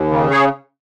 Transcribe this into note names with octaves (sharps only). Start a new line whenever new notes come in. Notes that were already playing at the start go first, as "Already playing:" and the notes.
Already playing: D#2
C#3
G#4 C#5